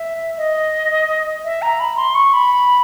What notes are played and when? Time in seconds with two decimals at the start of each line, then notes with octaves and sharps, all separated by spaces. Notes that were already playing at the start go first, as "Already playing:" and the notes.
Already playing: E5
0.37 D#5
1.44 E5
1.62 A#5
1.80 B5
1.97 C6
2.15 C#6
2.33 B5